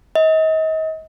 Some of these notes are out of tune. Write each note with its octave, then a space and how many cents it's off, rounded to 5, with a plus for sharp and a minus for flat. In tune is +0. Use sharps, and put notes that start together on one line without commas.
D#5 +35